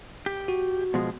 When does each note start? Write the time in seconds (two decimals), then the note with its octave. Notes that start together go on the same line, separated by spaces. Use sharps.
0.26 G4
0.48 F#4
0.94 B2 F3 G#3